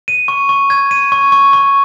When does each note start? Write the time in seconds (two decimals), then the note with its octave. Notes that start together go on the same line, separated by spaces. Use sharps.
0.08 D#7
0.28 C#6
0.49 C#6
0.70 G#6
0.91 D#7
1.12 C#6
1.32 C#6
1.53 C#6